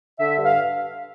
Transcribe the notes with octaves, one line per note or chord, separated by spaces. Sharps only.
D3 E5
G2
F5